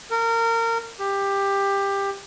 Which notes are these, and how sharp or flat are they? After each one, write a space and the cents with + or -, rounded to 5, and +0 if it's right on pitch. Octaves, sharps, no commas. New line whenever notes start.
A#4 -25
G4 +15